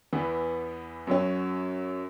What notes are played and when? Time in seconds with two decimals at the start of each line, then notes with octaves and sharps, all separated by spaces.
0.13 E2 E3 B3
1.07 F#2 F#3 C#4